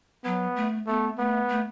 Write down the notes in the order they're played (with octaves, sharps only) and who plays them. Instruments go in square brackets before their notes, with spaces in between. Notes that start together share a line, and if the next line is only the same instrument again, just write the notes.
[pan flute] F#3 [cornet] B3
[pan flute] A3
[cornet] A3 [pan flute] B3
[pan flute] A3 [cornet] B3
[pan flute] A3